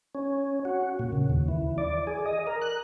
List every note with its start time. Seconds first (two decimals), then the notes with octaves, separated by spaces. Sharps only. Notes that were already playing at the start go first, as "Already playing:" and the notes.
0.15 C#4
0.65 F#4
0.99 A#2
1.13 C#3
1.30 D#2
1.48 E3
1.78 D5
2.07 G#4
2.26 D#5
2.47 A#4
2.61 F#6